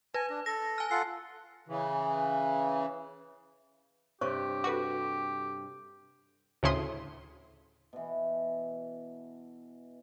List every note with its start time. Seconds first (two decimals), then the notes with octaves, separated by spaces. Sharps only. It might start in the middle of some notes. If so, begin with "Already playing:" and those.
0.14 B4 G#5
0.30 D4
0.46 A4 A#6
0.78 G#5 F6
0.91 F4 A4 F#5 C7
1.68 C#3 E3
4.21 G2 C3 G4 C5 C#5 C#6
4.64 F#4 A4 B4 D6
6.63 D2 A2 C#3 E4 C6 D#6
7.93 B2 E3